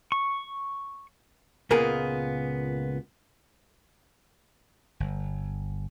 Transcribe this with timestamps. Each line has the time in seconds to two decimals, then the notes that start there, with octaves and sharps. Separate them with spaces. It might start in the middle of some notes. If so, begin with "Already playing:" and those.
0.12 C#6
1.71 C#2 A#2 A#3 B3 G#4 A#4
5.00 G1